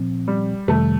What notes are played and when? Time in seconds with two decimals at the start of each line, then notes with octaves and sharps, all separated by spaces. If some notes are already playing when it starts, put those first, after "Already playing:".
Already playing: A#2 F3 C4
0.28 G3
0.68 F2 C3 D#3 G3 A3